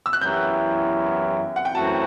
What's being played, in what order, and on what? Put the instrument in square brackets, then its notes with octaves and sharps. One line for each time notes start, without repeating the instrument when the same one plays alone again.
[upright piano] E6
F#6
[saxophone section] F#2 E3 B3 E4 G4 [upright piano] G6
[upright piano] F#5
G5
[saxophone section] F#2 E3 A3 C4 F#4 [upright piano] A5